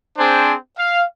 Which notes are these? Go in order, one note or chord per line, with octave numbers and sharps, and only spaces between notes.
C4 D4 G#4 C5 G#5
F5